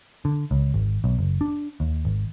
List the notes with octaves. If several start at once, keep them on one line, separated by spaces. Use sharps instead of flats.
D3
C#2
G#1
B1
F#1
D4
D#2
G#1